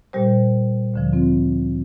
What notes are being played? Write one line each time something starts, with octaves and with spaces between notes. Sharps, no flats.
A#2 G3 G4 C5
D2 D3 F3
C4 F4